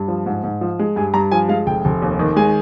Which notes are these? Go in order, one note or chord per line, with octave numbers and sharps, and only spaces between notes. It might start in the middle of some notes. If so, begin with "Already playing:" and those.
Already playing: G2
F3
G#2
G#2
F3
G#3
G2 G#5
G2 A#5
F3 G#5
G#3 F5
F1 G5
F1
D#2
D#3
G#3 G#5